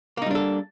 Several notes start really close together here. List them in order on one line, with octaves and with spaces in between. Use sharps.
A#3 D#4 G3 D4 A4